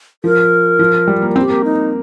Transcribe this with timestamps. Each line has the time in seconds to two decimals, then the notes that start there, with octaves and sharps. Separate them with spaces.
0.24 F3 A#4
0.79 F3
1.07 G3
1.22 A#3
1.36 C4 G4
1.50 A#3
1.64 D#4